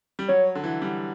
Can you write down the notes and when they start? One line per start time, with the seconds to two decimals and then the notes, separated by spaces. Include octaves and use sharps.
0.19 G3
0.28 F#3 C#5
0.55 D3
0.64 E3
0.82 G3